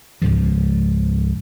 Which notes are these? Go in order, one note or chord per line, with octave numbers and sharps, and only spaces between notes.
C#2 G#2 C#3 F3